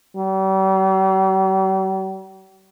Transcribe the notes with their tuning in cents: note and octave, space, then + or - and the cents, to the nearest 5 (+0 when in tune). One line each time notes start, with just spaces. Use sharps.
G3 -45